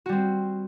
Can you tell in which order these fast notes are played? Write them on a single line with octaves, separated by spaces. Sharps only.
F#4 G3 C4